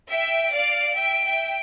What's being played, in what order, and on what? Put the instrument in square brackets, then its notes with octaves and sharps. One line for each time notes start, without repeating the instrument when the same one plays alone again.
[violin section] E5 G5 [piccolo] D7
[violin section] D5 F5
E5 G5
E5 G5